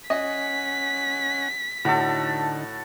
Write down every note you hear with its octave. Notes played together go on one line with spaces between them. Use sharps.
C#4 D#5 F#5 G#5 B6
A2 D3 D#4 F#4 A4